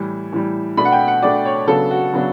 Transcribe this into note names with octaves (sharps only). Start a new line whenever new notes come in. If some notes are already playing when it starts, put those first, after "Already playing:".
Already playing: A2 E3 G3
A2 E3 G3
B2 A3 D4 B5
F#5
G5
F#5
B2 A3 D4 D5
C#5
C#3 F#3 B3 D4 A4
F#4
C#3 F#3 B3 D4